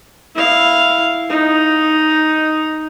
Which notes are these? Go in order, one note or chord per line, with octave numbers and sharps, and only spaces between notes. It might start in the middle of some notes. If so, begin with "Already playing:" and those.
E4 F5
D#4